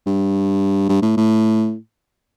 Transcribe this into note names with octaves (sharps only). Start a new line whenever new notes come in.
G2
G2
A2
A2